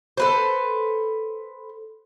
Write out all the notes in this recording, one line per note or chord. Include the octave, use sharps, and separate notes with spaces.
A4 B4 C5